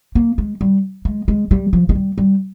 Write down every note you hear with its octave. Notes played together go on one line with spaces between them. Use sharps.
A#3
G#3
G3
G#3
G#3
G3
F3
G#3
G3
G3